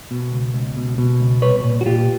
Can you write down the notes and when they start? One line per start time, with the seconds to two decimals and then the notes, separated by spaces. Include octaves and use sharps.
0.11 B2
0.32 C#2
0.54 C#2
0.76 B2
0.98 B2
1.20 C#2
1.42 C2 B4 C#5
1.64 A#2
1.81 F#4
1.85 A#2 F4 G4